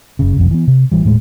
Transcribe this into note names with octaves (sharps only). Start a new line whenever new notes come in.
F#1 C#3
F1 B1 F2
E3 B3
C3
A1 E3 G3
D#1 A2 G#3